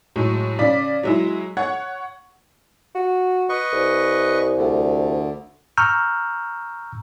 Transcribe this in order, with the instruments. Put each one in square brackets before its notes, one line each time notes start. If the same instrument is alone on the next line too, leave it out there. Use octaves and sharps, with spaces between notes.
[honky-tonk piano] A2 F#3 G#3
C#3 D5 B6
F#3 G#3 E4
C#5 F#5 C#6 G#6
[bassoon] F#4
[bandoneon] B4 D#5 C#6
[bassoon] C2
[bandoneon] D2 D3
[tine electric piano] A#5 C#6 E6 F6 G6